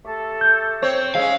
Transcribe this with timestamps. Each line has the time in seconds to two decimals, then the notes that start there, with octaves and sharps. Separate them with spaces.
0.05 A3 G4 A4
0.41 G6
0.82 C4 C#5
1.15 C2 G#3 C#4 E5 F5 E6